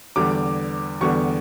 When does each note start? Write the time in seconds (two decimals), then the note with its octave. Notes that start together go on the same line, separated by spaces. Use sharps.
0.16 E2 D3 G3 B3 D6
1.01 E2 D3 G3 B3 C#6